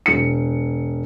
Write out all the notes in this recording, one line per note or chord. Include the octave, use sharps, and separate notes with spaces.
E1 C#7